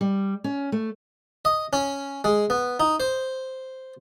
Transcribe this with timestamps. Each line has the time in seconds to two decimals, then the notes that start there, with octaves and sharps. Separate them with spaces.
0.01 G3
0.44 C#4
0.72 A3
1.45 D#5
1.73 C#4
2.24 G#3
2.50 B3
2.80 D#4
3.00 C5